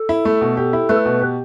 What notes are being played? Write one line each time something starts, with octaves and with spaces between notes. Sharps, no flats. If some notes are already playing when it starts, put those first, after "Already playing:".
Already playing: A4
E4
A3
B2
G4
E4
A3 B4
B2
G4